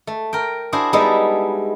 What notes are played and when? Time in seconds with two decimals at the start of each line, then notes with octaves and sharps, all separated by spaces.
0.07 A3
0.33 A#4 G5
0.72 D4 E4 F#4 G#4 C5
0.93 G3 G#3 B3 D#4 E4 A4